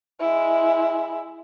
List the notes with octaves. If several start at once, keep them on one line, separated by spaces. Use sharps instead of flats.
G#3 E4